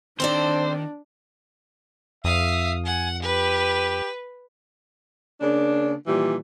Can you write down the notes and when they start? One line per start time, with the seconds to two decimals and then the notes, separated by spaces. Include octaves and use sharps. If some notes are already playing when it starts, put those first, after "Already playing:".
0.20 D#3 C4 D4 A4 C5 D5
2.24 F2 E5 F5 D#6
2.86 F#5 G#5
3.22 G4 B4
5.41 C#3 A#3 D4
6.07 A#2 D#3 E3 G3 G4